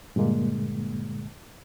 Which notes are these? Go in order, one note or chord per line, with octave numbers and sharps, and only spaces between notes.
G2 A#2 D3 G#3 A#3